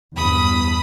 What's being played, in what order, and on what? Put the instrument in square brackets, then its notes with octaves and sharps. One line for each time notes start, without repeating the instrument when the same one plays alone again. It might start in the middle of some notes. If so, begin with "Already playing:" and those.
[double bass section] E2 G2 [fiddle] B5 D#6